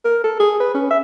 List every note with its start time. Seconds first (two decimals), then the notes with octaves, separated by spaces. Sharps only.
0.05 A#4
0.24 A4
0.40 G#4
0.60 B4
0.74 C#4
0.90 E5